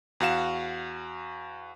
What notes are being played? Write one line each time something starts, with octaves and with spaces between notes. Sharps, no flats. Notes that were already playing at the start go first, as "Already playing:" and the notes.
E2 F#4 F5 E7